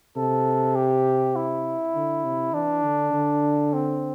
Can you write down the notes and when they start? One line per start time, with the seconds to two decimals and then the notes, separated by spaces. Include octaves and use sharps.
0.16 C3 A4
0.76 G4
1.36 E4
1.95 D3
2.24 C3
2.54 E3 D4
2.83 D3
3.13 D3
3.73 C4